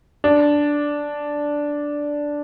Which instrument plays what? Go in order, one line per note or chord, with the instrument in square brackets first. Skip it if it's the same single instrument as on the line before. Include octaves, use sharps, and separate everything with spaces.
[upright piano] D4